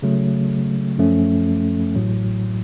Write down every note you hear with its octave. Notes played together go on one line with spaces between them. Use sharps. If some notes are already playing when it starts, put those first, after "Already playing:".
C#3 F#3 A3
F#2 F3 A3 C#4
A1 A2 F#3